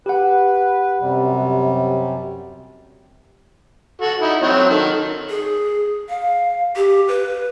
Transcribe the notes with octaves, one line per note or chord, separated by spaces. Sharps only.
G4 B4 F#5
F#2 C3 G3
F#4 A4
D#4 E4
F#3 C4 C#5
D#3 A4
G#4
F5
G4
B4